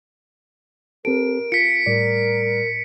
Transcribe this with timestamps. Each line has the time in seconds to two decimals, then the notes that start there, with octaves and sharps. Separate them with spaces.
1.05 C4 G4 A4 A#4 D7
1.52 F4 B6 C#7
1.86 A2 G3 A#4 D5